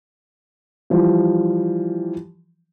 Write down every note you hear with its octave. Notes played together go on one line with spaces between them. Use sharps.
E3 F3 G3